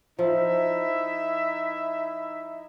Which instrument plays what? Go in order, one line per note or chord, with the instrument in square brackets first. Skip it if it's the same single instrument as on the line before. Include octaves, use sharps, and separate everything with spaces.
[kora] F3 [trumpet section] D#4 E4 E5